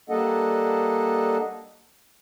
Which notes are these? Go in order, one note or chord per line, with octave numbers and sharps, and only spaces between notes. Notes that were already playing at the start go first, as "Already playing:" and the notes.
G3 A#3 D4 A4 D#5 F#5